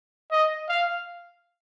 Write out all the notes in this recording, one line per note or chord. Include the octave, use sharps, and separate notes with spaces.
D#5
F5